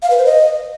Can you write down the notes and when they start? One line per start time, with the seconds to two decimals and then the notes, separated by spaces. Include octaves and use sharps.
0.03 F5
0.10 B4
0.18 C5
0.26 D#5